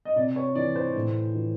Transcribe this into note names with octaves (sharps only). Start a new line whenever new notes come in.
D#5
C3 D5
C#5
E3 D5
C5
A2
E3